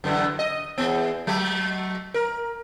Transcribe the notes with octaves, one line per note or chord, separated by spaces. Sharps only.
F#2 D3 E3
D#5
E2 B3
F#3 A3
A#4